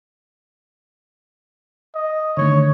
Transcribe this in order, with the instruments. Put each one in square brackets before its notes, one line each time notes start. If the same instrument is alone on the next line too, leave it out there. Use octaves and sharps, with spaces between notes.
[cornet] D#5
[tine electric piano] D3 D#3 A3 [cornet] C#5